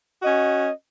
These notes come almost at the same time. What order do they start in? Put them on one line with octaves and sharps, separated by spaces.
D#5 F#4 C#4